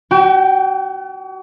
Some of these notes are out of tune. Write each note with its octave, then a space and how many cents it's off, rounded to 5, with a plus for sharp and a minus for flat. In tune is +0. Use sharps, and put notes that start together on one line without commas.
F#4 +40 G5 +0